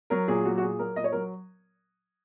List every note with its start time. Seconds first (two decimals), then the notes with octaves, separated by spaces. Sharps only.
0.10 F#3 A#4
0.28 A#2 G#4
0.45 F#3 F#4
0.58 F#4
0.62 A#2 G#4
0.79 F#3 A#4
0.96 A#2 D#5
1.04 C#5
1.12 F#3 A#4